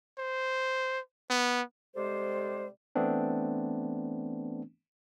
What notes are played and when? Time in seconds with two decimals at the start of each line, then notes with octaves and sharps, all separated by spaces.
0.18 C5
1.30 B3
1.95 C3 G3 G#3 G4 A4 C5
2.95 E3 A3 B3 C4 D4